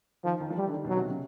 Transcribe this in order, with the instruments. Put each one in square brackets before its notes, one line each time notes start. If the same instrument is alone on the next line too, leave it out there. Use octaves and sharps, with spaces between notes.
[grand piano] D#3 [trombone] F3
[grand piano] D#3
F3
[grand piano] E3 [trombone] G3
[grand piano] D3
D#3
[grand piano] B2 [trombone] F#3
[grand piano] C3
C#3